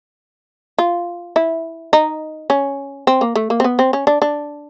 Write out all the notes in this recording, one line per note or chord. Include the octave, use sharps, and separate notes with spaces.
F4
E4
D#4
C#4
C4
A#3
A3
A#3
C4
B3
C4
C#4
D4
D4